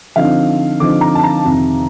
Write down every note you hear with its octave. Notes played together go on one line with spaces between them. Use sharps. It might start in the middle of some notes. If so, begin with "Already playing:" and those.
D3 F3 C4 D#4 F5
D3 F3 C4 D#4 D6
A#5
A5
A#5
F2 C3 D#3